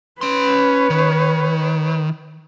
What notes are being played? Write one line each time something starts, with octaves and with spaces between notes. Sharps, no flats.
C#4 B4 C#5 C6
D#3